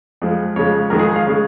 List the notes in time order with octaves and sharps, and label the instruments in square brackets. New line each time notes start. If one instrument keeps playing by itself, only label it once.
[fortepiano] F2 F3 G#3
F2 C#3 G#3 C#5
F2 D#3 G#3 A#4
G#4
F5
C#3 G#3